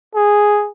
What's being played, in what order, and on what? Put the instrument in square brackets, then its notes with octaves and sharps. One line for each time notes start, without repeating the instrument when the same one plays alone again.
[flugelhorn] G#4